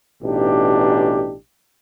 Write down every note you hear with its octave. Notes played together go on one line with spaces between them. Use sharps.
A1 B2 D4 D#4 G4